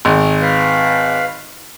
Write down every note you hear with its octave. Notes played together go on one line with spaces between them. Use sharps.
G#1
B4 F5